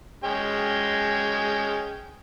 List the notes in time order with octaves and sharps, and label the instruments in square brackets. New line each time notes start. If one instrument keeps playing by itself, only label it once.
[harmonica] G#3 C#4 G5